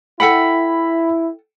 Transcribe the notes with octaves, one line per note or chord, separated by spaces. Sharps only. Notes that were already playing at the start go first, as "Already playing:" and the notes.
E4 A4 F#5 G5 B5 B6